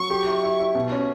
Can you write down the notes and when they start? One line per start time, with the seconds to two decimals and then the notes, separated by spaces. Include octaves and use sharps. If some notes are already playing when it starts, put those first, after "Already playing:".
Already playing: F#3 C#6
0.10 G4
0.26 E4
0.43 E4
0.60 E4
0.75 B2
0.92 C#4